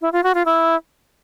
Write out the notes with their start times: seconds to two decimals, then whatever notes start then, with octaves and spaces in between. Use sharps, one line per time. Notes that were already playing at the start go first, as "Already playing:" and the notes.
0.01 E4
0.12 F4
0.24 F#4
0.35 F4
0.46 E4